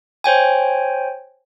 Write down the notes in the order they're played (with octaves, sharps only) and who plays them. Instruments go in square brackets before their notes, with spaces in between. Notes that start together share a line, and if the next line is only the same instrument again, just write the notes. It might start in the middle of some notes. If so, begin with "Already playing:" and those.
[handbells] C5 C#5 G5 G#5